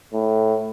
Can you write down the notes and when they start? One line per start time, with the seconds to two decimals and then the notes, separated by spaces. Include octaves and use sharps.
0.13 A2